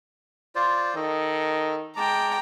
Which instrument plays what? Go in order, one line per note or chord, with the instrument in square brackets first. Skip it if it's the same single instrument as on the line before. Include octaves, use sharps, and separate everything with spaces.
[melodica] F4 C5 D5
[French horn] D#3 [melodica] A4 D#5
[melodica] G#3 A5 D6 [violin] G5 A#5